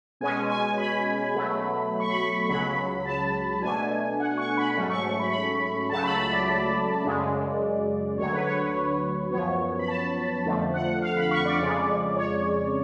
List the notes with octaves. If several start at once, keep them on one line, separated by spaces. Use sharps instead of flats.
B2 G#3 C#4 G#5
G#5
B5
B2 F#3 A3
C#6
B5
C#6
C#2 C#3 F#3 B5
A5
B2 A3 D4 G#5
F#5
C#6
B5
G#2 F#3 A3 C#4
C#6
C#6
B5
B5
C#2 C#3 F#3 A3 A5
B5
B5
D5
D5
F#2 C#3 G#3
D2 D3 F#3 C#5
B4
C#5
B4
F#2 F3 B3 C#5
B5
A5
F2 D3 F3 A3
F#5
F5
B5
C#6
D5
F2 C#3 G#3 D5
C#5